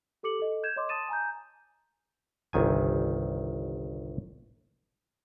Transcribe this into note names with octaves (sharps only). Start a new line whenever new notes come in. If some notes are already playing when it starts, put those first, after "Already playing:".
G4 A4 D6 C#7 F#7
A4 D#5
G6 G#6 E7
C#5 D#5 C6 D6
A5 C6 D#6 A6 D#7 E7
G#5 A#5 G6
G1 C2 D#3 G#5